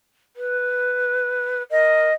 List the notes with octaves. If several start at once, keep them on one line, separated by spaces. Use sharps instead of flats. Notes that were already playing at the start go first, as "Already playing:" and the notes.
B4
A#4 D#5